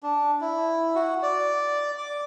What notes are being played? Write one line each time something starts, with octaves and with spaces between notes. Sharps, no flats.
D4
E4
F#4
D5
D6